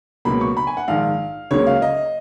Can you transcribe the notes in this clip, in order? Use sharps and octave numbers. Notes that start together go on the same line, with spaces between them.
C#2 B2 F#3 A#3 B5
C#6
B5
G#5
F#5
A#1 G#2 D#3 F5
C#2 C#3 F#3 A#3 C#5
F5
D#5